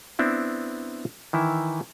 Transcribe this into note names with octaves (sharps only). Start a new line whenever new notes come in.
B3 C4 D4 E4
D#3 E3 E4